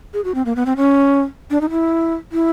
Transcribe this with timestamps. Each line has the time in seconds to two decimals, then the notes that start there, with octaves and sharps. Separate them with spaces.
0.14 G#4
0.24 F#4
0.35 C4
0.46 A#3
0.56 B3
0.66 C4
0.77 C#4
1.51 D4
1.61 D#4
1.70 E4
2.32 E4